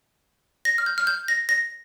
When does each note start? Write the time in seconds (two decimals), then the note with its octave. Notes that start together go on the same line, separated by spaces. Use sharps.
0.65 A#6
0.78 F6
0.86 G6
0.98 F6
1.07 G6
1.28 A#6
1.49 A#6